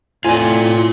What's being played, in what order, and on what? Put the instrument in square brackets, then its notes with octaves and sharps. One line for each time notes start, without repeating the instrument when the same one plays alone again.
[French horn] A2 [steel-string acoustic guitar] E3 C4 [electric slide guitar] F4 D5 [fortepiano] G#5